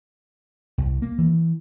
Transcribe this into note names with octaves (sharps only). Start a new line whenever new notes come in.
C2
A#3
E3